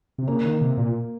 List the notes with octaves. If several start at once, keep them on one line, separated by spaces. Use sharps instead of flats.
C3
C#3 A#3
D#3
C3
A#2